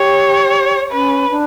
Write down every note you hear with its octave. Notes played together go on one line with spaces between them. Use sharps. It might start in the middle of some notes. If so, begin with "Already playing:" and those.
Already playing: G4 C#5
C#4 B4
D4